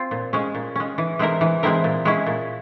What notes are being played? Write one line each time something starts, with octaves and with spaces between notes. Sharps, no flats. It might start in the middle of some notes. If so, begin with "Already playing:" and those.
Already playing: C4 F4 C5
A#2
G#3 C#4
A#2
G#3 C#4
E3
G#3 C4 E4 A#4
E3
G#3 C4 E4 A#4
A#2
G#3 C#4 E4
A#2